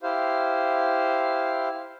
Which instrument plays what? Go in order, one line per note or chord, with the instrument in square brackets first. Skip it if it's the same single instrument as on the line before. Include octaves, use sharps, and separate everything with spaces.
[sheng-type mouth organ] E4 G4 C5 F5